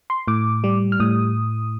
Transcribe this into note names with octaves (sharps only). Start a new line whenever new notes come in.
C6
A2 D6
G3
F6
A2 D#6